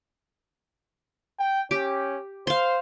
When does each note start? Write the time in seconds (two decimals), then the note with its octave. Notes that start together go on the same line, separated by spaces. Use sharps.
1.39 G5
1.71 C#4 G4
2.47 C5 F5 C6